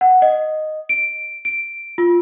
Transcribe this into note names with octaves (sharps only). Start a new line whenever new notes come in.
F#5
D#5
D7
D7
F4